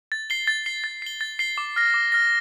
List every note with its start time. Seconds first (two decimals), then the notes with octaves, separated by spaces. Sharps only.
0.12 A6
0.30 C7 G7
0.47 A6
0.66 C7 G7
0.84 A6
1.02 C7 G7
1.21 A6
1.39 C7 G7
1.58 D6
1.76 F6 A#6
1.94 D6
2.12 F6 A#6